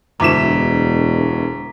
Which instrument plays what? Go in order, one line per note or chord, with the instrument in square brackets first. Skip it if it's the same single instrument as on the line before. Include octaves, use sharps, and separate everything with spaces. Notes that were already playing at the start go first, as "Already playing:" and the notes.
[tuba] E1 [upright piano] D2 E4 E7 [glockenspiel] A#5 D6 B6